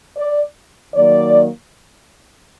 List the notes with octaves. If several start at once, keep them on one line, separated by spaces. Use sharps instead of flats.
D5
D#3 F#3 A#3 D5